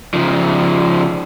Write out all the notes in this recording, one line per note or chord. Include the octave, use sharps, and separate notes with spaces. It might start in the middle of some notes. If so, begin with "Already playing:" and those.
C#3 F3